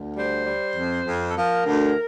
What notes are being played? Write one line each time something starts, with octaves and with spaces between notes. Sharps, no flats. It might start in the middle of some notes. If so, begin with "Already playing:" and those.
Already playing: D2
G3 C5
G3
F2
F2
A4
F3 A#4
D2